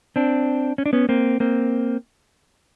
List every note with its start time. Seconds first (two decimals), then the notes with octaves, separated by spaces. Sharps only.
0.16 C4 D4
0.78 C#4
0.86 D4
0.93 B3 C#4
1.09 A#3 C4
1.40 A#3 C4